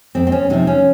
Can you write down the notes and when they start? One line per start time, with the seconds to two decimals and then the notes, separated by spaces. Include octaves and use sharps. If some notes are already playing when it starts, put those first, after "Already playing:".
0.15 F2 C4
0.27 C4
0.32 C#4
0.50 C3 F3 D#4
0.67 C#4